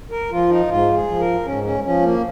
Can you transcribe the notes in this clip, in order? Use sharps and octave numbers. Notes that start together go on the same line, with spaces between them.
A#4
F3 F4
D#4
G#2 F4
G#4
F3
A#4
G#2 C#4
C#4
F3 C#4
A#3